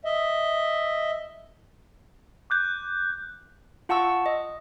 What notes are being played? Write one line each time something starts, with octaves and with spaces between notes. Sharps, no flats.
D#5 E5
D6 F#6 G6
F4 F#5 A5 C#6 E6
D#5